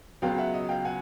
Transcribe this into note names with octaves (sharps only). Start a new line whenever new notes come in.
C#2 C#3 F#3 B3 F5 G5
E5 F#5
D#5
F5 G5
F#5 G#5